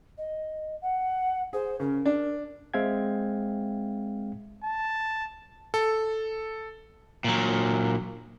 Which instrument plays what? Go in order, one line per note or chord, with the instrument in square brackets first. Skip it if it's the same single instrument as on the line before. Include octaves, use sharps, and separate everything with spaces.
[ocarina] D#5
F#5
[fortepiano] G#4 [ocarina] C5
[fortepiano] C#3 [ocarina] A#4
[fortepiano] D4
[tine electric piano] G#3 C4 E5 F5 G5 G#6
[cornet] A5
[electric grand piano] A4
[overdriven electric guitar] A#2 F#3